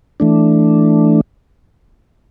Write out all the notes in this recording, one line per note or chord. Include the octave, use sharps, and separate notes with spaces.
E3 A3 D4